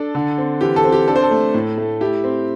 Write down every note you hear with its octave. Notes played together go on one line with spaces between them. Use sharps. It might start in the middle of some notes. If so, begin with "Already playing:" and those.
Already playing: D4 A4
D3
C4
E3 G4
A4
C4
G4
D4 A4
C5
A4
A3
A2
A3
E4 G4
C4